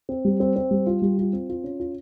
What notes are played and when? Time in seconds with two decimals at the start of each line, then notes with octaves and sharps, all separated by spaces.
0.09 C4
0.25 G3
0.40 C4
0.56 C4
0.71 G3
0.86 F4
1.02 G3
1.18 F4
1.33 C4
1.49 F4
1.64 C#4
1.80 F4